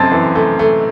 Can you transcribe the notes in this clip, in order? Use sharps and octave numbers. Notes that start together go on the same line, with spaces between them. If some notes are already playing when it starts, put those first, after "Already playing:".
Already playing: F#2 C4 A5 A6
E3
A3
A3